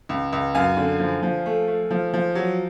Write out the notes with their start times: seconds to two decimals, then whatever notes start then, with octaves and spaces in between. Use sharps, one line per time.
0.09 C#2
0.33 C#2
0.55 F#2 F5 G#5
0.77 D3
1.00 F3
1.23 F3
1.46 A3
1.68 A3
1.91 F3
2.14 F3
2.35 F#3